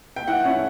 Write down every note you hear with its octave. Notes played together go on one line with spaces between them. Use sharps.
G5
E3 F#5
A3 C#4 E4